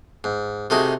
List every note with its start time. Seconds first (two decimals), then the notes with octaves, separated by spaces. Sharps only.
0.24 G#2
0.70 C3 A3 D#4 F#4 G#4